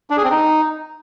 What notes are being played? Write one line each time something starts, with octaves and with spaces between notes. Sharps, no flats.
D4
G#4
C4
D#4